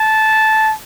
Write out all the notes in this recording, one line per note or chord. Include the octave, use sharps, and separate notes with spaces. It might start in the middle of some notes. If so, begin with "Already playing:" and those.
Already playing: A5